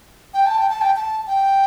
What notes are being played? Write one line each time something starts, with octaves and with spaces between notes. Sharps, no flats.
G5
A5
G5
A5
G5
A5
G5